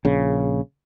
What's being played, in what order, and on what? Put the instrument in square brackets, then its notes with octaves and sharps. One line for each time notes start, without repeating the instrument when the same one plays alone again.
[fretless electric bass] A#1 C#3